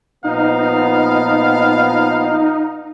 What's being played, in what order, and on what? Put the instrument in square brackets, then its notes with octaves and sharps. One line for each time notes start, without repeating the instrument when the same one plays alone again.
[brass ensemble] A#2 F3 B3 [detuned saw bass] D#4 [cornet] F5